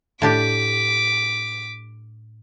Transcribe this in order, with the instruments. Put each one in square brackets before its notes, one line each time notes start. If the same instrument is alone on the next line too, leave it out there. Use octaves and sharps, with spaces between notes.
[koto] A2 D4 G4 [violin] D6 B6